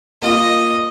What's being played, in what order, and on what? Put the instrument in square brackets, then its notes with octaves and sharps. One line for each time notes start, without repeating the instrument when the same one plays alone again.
[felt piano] A#3 F4 [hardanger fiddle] D#5